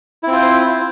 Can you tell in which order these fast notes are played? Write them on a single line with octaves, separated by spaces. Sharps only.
E4 C4 F4 C5